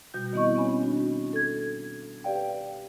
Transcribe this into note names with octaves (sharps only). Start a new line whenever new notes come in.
B2 G3 F#4 G6
D#3 B3 C4 E4 D#5 C#6
C4 C#4 C#5 G#5 B5
D4 F#4
A4 G#6
G4 B4 D5 F5 G5